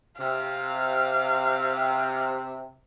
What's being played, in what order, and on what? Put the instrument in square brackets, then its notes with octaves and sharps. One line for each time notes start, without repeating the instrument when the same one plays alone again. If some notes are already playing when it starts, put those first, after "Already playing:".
[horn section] C3 [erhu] F5